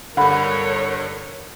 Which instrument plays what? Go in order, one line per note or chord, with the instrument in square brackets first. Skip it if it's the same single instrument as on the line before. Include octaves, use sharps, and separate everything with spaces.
[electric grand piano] G2 D3 [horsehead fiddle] A#4 C#5 [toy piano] F#5 B5